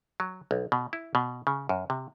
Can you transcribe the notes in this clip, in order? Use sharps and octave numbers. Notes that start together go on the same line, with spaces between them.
F#3
B1
B2
E4
B2
C#3
F#2
C3